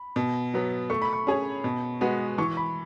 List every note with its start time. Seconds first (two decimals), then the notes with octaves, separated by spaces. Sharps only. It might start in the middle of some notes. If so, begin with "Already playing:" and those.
Already playing: B5
0.16 B2
0.54 F#3 B3
0.90 A3 C#6
1.02 B5
1.13 C#6
1.27 C#4 G#4 C#5
1.64 B2
2.01 G#3 B3 F#4 B4
2.38 E3 C#6
2.57 B5